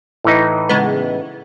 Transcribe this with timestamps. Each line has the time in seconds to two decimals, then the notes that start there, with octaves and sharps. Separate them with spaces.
0.24 A2 E3 D#4
0.69 C#3 G#3 B3